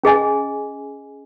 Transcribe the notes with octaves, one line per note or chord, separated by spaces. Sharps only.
C#4 G#4 D#5 G#5